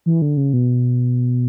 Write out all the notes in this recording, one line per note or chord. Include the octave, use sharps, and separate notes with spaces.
E3
D3
C#3
B2